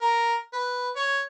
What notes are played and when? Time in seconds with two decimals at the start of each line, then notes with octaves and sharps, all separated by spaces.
0.02 A#4
0.53 B4
0.96 C#5